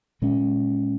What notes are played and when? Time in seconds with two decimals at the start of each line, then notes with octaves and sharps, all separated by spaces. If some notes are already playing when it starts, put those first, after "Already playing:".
0.22 A#2 G#3 C#4